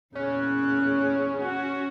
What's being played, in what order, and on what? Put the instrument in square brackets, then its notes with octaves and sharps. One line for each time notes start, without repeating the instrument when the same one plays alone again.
[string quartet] E2 A#2 C#3 [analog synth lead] C#4 [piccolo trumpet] F#6
[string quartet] F#4 [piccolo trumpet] F#5